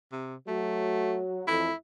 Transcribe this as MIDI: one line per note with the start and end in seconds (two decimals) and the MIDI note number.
0.12 0.36 48
0.48 1.46 54
0.48 1.21 57
0.48 1.46 66
1.47 1.69 41
1.47 1.69 52
1.47 1.69 57
1.47 1.74 64